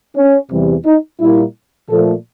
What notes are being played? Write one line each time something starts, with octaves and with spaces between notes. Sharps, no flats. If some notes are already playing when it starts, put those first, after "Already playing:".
C#4
E2 C3 E3 G3
D#4
A#2 G3 A#3 E4
A#2 F3 A3 A4